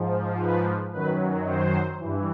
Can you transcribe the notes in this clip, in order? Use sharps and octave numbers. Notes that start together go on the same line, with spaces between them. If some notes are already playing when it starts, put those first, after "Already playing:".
Already playing: G#2 F3
B4
F#2 D#3 F#3 B4
C5
G2 E3